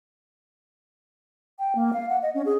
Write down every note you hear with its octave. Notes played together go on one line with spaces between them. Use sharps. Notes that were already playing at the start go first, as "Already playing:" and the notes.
G5
A#3
F5
F#5
D#5
C#4
G#4